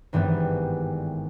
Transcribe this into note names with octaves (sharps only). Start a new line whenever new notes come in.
G#1 G2 E3 G3 B3